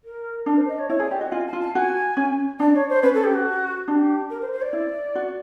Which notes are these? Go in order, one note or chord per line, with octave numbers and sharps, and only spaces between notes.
A#4
D4 A#4
C5
D#5
C#5
E4 C#5
G#4
D5
G4
F#4 D#5
F4 G#5
A5
F4
A5
F#4 G#5
C#4
D4 D5
C#5
C5
C#4 B4
A4
G4
F#4
D4 G4
A#4
C5
C5
D5
E4
F#4